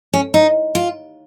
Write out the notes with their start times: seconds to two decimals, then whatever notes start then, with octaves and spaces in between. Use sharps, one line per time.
0.14 C#4
0.34 D#4
0.75 F4